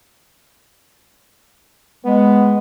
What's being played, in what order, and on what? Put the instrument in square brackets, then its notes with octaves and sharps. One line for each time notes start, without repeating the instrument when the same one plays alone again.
[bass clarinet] G#3 [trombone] B3